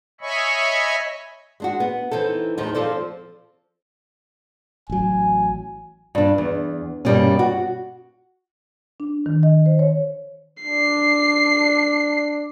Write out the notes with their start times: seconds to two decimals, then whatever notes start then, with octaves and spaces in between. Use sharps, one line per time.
0.21 C#5 D#5 E5 G#5 B5 C#6
1.60 G#3 D4 F#4
1.80 B3
2.11 E3 C4 D#4 A4
2.57 E2 A2 F3 D#4
2.75 F3 C4 A4 D5
4.90 A1 F#3 G#5
6.15 G2 D4
6.38 E2
7.05 G2 B2 G3 A#3 C#4
7.39 F#4
9.00 D4
9.26 D#3
9.43 D#5
9.66 C5
9.79 C#5
10.63 D4 C7